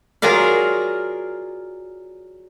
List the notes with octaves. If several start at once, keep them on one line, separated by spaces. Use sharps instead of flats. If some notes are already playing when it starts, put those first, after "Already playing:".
F#3 F4 G#4 A#4 D5 F5